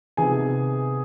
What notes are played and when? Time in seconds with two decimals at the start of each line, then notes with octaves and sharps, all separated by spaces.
0.17 C3 D#3 B3 G#4 G#5